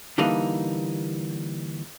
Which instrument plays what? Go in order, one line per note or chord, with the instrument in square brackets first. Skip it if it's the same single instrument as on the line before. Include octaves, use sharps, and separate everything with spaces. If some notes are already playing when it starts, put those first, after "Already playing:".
[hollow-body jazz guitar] D3 E3 G3 A#3 D#4